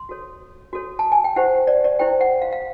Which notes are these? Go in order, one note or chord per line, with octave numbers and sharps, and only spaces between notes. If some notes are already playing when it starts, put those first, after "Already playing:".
Already playing: C6
F#4 A4 C#5
F#4 A4 C#5
A5
G#5
G5
E4 G4 C5 F#5
D5
D5
E4 G4 C5 G5
F#5
F5
F5